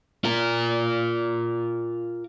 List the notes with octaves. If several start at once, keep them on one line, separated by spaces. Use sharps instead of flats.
F4 A#4